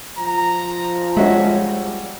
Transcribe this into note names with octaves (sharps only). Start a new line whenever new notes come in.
F3 A#5
G3 G#3 C#4 F#4 E5